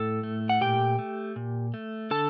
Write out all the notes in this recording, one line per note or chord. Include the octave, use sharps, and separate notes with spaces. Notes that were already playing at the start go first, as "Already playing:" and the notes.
Already playing: A2 A4
A3
F#5
A#2 G4 G5
A3
A#2
A3
D3 A4 A5